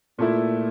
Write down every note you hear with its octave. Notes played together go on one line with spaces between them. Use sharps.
A#2 A3 A#3 E4